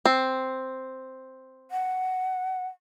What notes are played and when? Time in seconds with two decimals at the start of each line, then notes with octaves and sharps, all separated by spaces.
0.06 C4
1.71 F#5